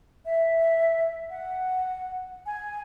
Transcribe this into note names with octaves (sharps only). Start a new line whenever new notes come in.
E5
F#5
G#5